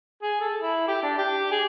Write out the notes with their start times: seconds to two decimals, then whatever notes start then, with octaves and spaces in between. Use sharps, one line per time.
0.22 G#4
0.41 A4
0.61 E4
0.88 G4
1.03 D4
1.18 G4
1.51 G#4